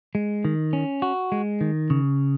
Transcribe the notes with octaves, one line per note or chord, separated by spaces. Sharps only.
G#3
D#3
C#4
F#4
G#3
D#3
C#3